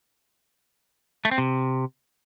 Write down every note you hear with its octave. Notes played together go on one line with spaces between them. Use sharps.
A3
C4
C3